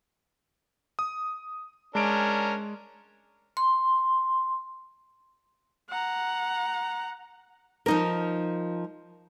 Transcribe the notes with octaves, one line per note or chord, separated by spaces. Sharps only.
D#6
G#3 C#4 D4 A#4 D7
C6
F#5 A#5
F3 D#4 A#4